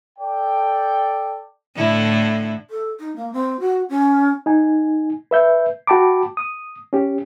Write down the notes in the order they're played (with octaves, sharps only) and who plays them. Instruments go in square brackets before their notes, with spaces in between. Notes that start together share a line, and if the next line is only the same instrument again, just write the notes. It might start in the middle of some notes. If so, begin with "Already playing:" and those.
[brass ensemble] A4 D5 G5
[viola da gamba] A2 D3 E4
[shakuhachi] A4
D#4
A#3
C4
F#4
C#4
[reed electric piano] D#4 G#5
B4 E5 G6
F#4 G5 A5 B5 D6
D#6
C#4 G4